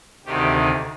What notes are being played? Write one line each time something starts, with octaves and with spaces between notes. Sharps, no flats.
D2 C3 D#3 G4